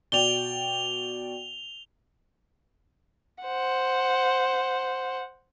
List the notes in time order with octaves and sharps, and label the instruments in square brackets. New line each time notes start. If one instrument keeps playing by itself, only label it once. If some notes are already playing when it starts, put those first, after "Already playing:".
[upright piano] B2 D5 G5 [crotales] F7 G7
[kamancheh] C5 F#5